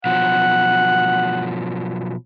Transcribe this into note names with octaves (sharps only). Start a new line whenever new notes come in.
B2 F3 F#3 F#5